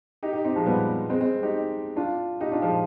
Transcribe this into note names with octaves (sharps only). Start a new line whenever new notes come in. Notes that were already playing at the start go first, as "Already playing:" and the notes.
D#4 G4
D#4 G4
C4 D#4
F3 G#3
G3 B3
G#3 C4
G#3 C4
D#4 G4
D4 F4
D#4 G4
D4 F4
F3 G#3